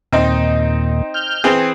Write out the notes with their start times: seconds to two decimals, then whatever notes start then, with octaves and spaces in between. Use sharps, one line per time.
0.13 D#2 A#2 C4 D#4
1.14 F6 G6
1.44 E3 C4 G#4